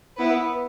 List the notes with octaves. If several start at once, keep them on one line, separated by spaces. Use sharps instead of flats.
B3 E4 B4